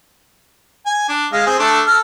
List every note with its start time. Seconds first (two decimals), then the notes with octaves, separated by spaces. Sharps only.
0.86 G#5
1.09 D4
1.32 G#3 F5
1.46 C4 G#4
1.59 A3 D4 A4
1.87 A4 F6